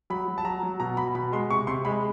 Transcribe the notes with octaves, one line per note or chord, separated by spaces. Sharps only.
F#3 B5
F#3
A5
F#3 A#5
F#3
B2 A#5
B2 B5
B2 B5
G#3 C6
C3 C#6
C3 C6
G#3 B5